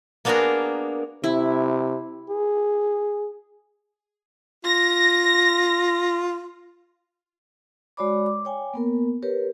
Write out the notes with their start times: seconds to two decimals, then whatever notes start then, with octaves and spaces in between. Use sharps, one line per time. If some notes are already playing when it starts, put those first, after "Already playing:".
0.25 A#3 B3 D4 F#4 G#4 A#4
1.24 C3 E4
2.30 G#4
4.64 F4 A#6
7.97 G#3 F#4 C#5 D5 B5 D6
8.26 D6
8.45 C#5 G5 G#5
8.74 A#3 B3 A#4
9.23 G4 A#4 B4 C#5